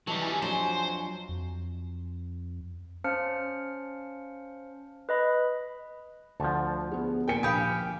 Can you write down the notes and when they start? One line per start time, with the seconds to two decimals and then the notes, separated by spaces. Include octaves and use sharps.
0.07 D#3 E3 F#3 G3 A5
0.20 G#5
0.42 F2 F#3 D4 C5
1.29 F2
3.04 C#4 C5 F5 A5 F6 C#7
5.09 B4 D#5 B5
6.40 D2 F3 F#5 A5
6.91 B3 G#4
7.28 A#2 A#4 G5 G#5 C#7
7.43 A#1 G4 F5 G5 G#5 B5 D#6